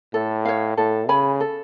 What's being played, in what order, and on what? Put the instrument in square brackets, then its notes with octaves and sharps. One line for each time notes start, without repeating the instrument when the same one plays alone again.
[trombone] A2 [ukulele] A4
[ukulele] C#5 F5
[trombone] A2 [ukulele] A4
[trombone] C#3 [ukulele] C#5 G#5 B5
[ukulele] A4